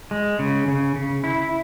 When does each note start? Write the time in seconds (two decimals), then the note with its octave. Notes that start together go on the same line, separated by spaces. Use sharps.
0.11 G#3
0.39 C#3
0.68 C#3
0.96 C#3
1.24 E4